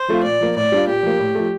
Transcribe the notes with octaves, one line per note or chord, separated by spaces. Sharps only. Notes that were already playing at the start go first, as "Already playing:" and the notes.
Already playing: C5
F3 A3 C4 F4
A#2 D5
F3 A#3
A2 D5
G3 D4 F4
A#2 G4
F3 A#3
A2
F3 A3